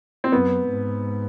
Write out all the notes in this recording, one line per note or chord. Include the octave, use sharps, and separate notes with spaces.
C4
F#2 B3
G#2